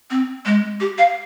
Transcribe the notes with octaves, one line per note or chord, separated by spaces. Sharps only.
C4
G#3
G4
F5